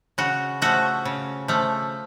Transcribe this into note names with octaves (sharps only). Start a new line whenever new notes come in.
C#3 F#4
F3 A3 F#4
C#3
F3 A3